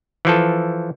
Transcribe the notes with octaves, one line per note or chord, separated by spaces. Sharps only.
E3 F3 A4